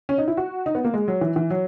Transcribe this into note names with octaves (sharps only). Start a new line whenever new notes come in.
C#4
D#4
E4
F#4
D#4
B3
A#3
G#3
F#3
E3
E3
F#3